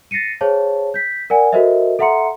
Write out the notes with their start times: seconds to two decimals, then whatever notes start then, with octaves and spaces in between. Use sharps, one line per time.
0.11 A6 A#6 C7 C#7 D#7
0.41 G#4 C5 C#5 F5 A5
0.94 G6 B6
1.30 A#4 D5 F#5 G#5
1.53 F#4 A4 A#4 C5 D#5 E5
1.99 A4 E5 F#5 A#5 C6 C#7